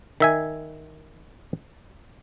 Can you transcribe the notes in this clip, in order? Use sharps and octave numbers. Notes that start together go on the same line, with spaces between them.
D#3 E5 G#5